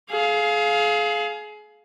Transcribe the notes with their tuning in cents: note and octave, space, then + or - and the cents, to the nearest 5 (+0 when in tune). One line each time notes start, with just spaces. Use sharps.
G#4 +30 F5 +0